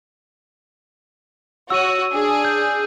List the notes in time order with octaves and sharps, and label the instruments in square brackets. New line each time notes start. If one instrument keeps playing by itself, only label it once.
[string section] F#4 C#5 [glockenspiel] E6 D#7
[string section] D4 G#4
[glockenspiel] G6